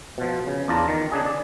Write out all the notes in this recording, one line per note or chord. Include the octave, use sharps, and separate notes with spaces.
B2 F3
C#3
E2 D4 F4 A5 A#5
D#3
C#3 D4 G#4
D5